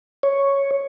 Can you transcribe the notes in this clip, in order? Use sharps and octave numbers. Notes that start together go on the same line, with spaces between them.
C#5